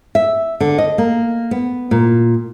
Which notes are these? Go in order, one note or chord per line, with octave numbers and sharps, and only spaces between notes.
E5
D3
D#5
A#3
B3
A#2